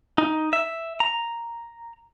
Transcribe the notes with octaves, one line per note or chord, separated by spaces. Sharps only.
D#4
E5
A#5